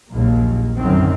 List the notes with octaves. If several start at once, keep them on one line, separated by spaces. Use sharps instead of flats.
A#1 D#2 A#2 F#3 A#3
F#2 A2 D3 D#3 C4